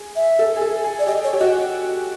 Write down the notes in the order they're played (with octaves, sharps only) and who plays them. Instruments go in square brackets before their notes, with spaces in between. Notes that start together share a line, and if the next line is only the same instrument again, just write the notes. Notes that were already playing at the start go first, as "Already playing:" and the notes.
Already playing: [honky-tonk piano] G#4
[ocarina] E5
[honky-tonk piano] A4
G#4
A4
G#4
[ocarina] D5
[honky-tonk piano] G4 [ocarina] D#5
[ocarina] C#5
[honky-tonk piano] G4
[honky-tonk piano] F#4 [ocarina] D#5